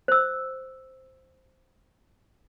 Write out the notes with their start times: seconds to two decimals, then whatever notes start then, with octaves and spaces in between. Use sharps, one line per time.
0.08 C5 E6